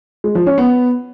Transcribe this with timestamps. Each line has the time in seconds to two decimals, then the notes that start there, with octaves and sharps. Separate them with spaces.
0.24 G#3
0.35 F3
0.46 C#4
0.58 B3